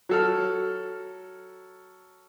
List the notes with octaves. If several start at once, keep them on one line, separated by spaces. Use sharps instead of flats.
F#3 A4 F6